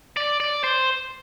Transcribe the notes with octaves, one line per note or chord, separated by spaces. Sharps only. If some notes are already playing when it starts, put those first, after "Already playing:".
D5
D5
C5